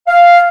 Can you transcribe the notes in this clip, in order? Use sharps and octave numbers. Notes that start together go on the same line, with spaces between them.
F5